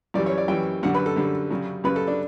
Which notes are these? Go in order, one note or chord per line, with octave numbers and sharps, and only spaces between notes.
F#2 E3 G3 D5
C#5
D5
F#2 E3 G3 G5
F#2 D3 G3 F#5
B4
A4
F#2 D3 G3
F#2 C#3 G3
F#2 C#3 G3 B4
A4
D4